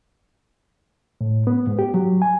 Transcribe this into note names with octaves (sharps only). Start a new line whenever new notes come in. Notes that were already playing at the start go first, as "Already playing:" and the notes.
A2
B3
G#2
G4
F#3
G#5